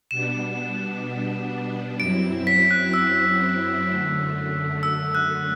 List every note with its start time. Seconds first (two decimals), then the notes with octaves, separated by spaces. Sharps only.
0.11 B2 G3 B3 D4 E7
1.99 F#2 F#3 C4 E4 D7
2.47 B6
2.71 F#6
2.94 E6
3.88 F#2 D3 A3
4.83 E6
5.15 F#6